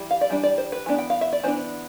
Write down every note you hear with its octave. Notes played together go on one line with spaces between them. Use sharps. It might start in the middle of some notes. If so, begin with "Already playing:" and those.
Already playing: E3 G3
F5
D5
E3 G3 D4 E5
D5
C5
B4
E3 B3 D4
G5
F5
E5
D5
E3 B3 D4 C5